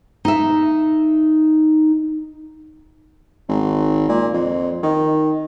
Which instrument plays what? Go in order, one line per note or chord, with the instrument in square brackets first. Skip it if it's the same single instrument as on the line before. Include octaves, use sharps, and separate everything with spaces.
[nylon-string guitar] D#4 E5
[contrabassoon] G#1
A#2
F2
D#3